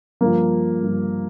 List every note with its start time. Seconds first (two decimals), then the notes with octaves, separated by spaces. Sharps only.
0.21 G2 F3 A#3
0.82 G2 F3